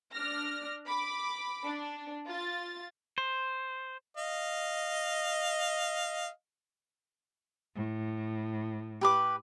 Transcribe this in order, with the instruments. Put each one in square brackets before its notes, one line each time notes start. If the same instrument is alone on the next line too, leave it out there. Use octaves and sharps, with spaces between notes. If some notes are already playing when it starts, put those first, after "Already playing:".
[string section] D4 F6 A#6
B5 D6
D4
F4 A6
[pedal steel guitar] C5
[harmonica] D#5 F5
[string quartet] A2
[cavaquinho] G4 B4 D6